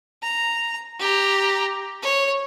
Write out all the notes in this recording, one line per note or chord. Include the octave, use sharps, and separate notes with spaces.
A#5
G4 A#5
C#5